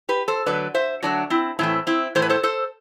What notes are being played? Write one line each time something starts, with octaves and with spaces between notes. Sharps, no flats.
G4 B4
A4 C5
D3 F#3 A3 B4 D5
C5 E5
D3 F#3 A3 D4 F#4
C4 E4
A2 E3 A3 C4 E4
C4 E4
A2 E3 A3 C5
B4
A4 C5
A4 C5